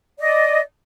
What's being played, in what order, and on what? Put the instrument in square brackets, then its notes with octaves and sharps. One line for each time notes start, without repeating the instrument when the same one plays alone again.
[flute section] D5 D#5